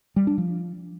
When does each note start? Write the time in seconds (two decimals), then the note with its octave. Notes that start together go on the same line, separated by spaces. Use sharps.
0.16 G3
0.27 D4
0.38 F3